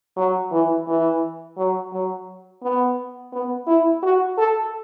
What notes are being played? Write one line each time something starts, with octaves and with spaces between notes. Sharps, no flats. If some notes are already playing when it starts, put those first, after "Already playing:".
F#3
E3
E3
F#3
F#3
B3
B3
E4
F#4
A4